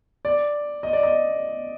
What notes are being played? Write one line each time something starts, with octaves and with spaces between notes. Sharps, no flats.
D5
D#5
D5
D#5